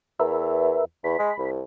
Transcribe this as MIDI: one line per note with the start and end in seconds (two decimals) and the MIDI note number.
0.20 0.80 40
0.20 0.85 70
0.20 0.85 71
0.20 0.85 76
1.04 1.16 40
1.04 1.50 83
1.19 1.32 56
1.39 1.63 36